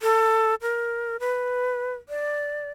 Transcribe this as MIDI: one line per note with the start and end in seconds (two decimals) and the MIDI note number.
0.01 0.55 69
0.62 1.17 70
1.20 1.93 71
2.09 2.71 74